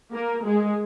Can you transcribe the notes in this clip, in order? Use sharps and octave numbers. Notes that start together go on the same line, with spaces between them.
A#3 A#4
G#3 G#4